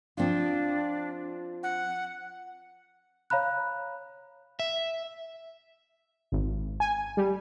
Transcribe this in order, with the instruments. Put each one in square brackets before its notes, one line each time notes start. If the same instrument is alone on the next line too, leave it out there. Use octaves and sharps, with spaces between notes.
[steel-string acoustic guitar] F3 C4 F4 [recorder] D4
[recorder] F#5
[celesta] C#5 F5 A#5 B5 F#6
[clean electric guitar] E5
[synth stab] G#1
G#5
G3